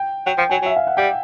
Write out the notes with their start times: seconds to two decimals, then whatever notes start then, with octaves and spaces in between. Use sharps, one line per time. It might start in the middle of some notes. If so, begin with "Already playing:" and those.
Already playing: G5
0.26 F#3 G5
0.38 F3 G5
0.50 F#3 G#5
0.62 F#3 E5
0.76 F5
0.87 F#5
0.97 G3 G5